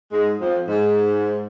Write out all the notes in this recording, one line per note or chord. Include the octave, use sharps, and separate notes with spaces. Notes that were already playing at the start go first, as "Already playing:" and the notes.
G#2 G#3
F2 F3
G#2